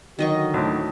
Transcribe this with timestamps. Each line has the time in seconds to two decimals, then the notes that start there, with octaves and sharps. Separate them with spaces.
0.19 D3 D#3 F#3 F#4 D#5 C#6
0.54 D2 A2